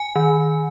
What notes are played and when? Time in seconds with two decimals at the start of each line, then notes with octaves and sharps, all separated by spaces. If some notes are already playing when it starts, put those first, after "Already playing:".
Already playing: G#5
0.16 D#3